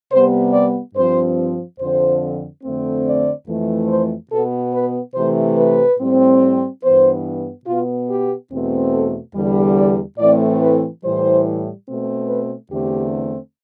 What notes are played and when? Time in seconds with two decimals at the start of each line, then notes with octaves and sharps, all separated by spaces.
0.11 C3 G3 B3 C5
0.53 D5
0.95 G2 F3 C4 C5
1.79 F2 D3 F3 C4 C5
2.63 F2 D3 A3 C4
3.05 D5
3.47 F2 E3 A3
3.89 C5
4.31 B2 B3 A4
4.73 B4
5.15 C3 E3 A3 C5
5.57 B4
5.99 A2 G3 C4
6.83 G2 E3 B3 C5
7.66 B2 B3 F4
8.08 G4
8.50 E2 B2 A3 C4
8.93 A4
9.34 E2 D3 G3
9.76 D5
10.18 A2 E3 A3 C4 D5
10.61 B4
11.02 A2 E3 G3 C5
11.87 B2 A3 C4
12.28 B4
12.70 E2 D3 A3 C4 G4